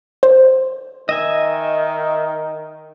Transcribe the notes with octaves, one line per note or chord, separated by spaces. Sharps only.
C5
D#3 D#5 E5 G#5